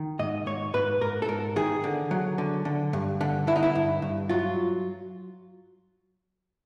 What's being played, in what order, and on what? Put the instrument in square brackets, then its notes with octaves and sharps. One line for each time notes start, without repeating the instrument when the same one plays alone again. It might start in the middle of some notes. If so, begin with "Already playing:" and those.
Already playing: [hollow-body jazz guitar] D#3
G#2 D#5
G#2 C#5
G#2 B4
G#2 A#4
A4
G#2 A#4
D#3 G#4
D3
F#3
D3
D3
G2
D3
D3 E4
D#4
E4
G2
G2
F#3 F4